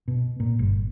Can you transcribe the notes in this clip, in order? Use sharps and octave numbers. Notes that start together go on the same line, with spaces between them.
B2
A#2
G1